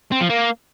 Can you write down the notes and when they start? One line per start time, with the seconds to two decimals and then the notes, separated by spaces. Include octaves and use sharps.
0.12 C4
0.21 F3
0.29 A#3